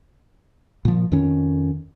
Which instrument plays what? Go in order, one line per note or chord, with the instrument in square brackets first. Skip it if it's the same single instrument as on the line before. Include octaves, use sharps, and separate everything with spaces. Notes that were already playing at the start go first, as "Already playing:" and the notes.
[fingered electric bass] A#2 F3
F2 D#3 C#4